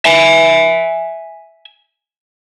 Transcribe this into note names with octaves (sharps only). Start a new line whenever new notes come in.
E5 G#5